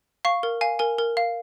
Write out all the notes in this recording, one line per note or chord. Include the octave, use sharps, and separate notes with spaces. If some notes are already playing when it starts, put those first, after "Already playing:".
F5 C#6
A#4
F5 G#5
A#4 G#5
A#4
F5